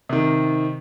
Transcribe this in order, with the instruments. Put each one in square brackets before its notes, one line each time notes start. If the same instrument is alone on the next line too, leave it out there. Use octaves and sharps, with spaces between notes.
[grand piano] C3 D#3